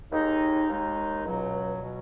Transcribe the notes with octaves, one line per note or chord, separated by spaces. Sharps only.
D#2 D#3 G#3 D#4
D#2 D#3 G#3 D#4
C#2 B2 F#3
B2 F#3